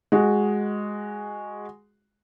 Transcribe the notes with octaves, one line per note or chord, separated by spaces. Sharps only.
G#3 F#4